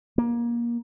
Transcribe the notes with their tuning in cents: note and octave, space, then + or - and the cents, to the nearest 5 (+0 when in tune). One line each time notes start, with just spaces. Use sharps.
A#3 +25